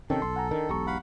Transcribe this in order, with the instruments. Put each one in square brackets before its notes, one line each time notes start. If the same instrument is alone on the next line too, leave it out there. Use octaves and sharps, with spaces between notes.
[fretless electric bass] C3 D#3 [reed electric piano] C4 C#4 G5 [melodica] A4
[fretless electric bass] B1 [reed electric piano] C6
[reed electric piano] F#5 G#5 A#5
[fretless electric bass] D#3 [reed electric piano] D4 A#4
[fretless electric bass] E1 B1 [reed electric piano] G4 A#5 C#6
[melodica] F5 F#5 B5